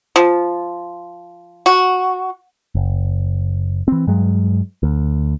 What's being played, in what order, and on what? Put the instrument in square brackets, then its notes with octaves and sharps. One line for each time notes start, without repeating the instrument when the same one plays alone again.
[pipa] F3
F#4
[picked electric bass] F#1
E3 C4
G2 F#3 G#3
D2